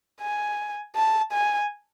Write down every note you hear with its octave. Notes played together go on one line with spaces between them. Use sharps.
G#5
A5
G#5